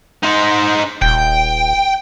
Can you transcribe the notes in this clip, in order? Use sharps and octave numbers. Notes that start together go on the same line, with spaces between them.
D#4 C5
D#1 G5